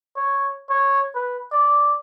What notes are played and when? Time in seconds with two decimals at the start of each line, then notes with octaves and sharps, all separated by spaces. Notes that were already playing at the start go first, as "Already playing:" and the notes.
0.16 C#5
0.69 C#5
1.15 B4
1.52 D5